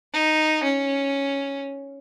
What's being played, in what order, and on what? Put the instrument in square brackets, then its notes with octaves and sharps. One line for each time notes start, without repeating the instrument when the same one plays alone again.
[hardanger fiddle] D#4
C#4